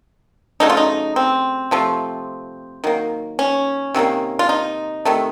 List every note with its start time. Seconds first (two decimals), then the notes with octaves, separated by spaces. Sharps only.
0.60 C#3 F#3 A3 D#4
0.70 F4
0.77 D#4
1.16 C4
1.71 C3 F3 A3
2.84 D#3 F#3 A#3
3.39 C#4
3.94 C3 D#3 F#3 A#3
4.39 F4
4.49 D#4
5.05 C3 D#3 A3